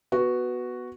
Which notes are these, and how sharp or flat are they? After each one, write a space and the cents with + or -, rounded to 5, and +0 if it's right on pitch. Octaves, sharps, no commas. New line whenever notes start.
B3 +0 F#4 +0